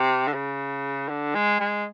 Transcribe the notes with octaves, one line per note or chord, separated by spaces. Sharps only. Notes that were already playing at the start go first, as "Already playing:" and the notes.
Already playing: C3
D3
C#3
D3
G#3
G#3